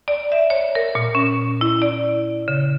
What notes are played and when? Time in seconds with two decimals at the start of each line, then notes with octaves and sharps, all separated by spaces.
0.08 D5
0.32 E5
0.50 C#5
0.75 A#4
0.95 A#2
1.15 C#4
1.61 E4
1.82 D5
2.48 C#3